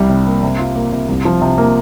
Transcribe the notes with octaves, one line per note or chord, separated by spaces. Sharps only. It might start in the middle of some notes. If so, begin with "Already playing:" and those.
Already playing: C2 G3
C3
A#3
C3
F4
A#3
C3
C2
F3
C3
A#3